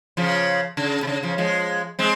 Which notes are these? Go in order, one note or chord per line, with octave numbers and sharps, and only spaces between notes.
C#3 F3
C#3
C3
C#3
C#3 F3
F3 G#3
G#3 C4